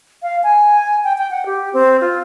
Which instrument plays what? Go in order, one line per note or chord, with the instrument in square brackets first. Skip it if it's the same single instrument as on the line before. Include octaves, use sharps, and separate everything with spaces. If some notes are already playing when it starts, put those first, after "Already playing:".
[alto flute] F5
G#5
G5
G5
F#5
G4
C4
F4